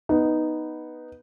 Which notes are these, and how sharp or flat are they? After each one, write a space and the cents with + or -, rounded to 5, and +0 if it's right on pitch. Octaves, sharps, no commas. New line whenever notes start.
B3 -5 D#4 +0